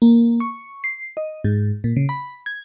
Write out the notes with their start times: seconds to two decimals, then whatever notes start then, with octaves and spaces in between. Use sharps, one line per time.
0.02 A#3
0.40 C#6
0.84 C7
1.17 D#5
1.44 G#2
1.84 A#2
1.97 C#3
2.09 B5
2.46 G#6